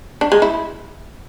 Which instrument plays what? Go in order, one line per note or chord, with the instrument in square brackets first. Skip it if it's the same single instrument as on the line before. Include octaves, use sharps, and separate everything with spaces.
[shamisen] D4
G#3
E4